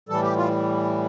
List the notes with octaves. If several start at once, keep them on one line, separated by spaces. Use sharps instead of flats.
A2 E3 G3 A4
G4
F4